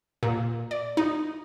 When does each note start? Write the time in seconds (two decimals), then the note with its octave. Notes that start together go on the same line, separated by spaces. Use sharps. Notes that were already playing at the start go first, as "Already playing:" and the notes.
0.23 A#2
0.71 D5
0.97 D#4